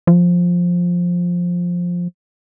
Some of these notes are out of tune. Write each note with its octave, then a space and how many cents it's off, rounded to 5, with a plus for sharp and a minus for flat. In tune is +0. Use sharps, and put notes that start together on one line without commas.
F3 +10